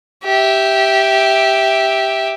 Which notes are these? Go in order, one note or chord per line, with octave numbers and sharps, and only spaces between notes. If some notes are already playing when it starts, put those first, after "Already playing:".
G4 E5